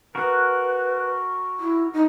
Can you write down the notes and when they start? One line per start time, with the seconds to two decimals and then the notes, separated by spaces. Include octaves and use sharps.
0.15 F#4 A#4 B4
1.59 E4
1.93 D#4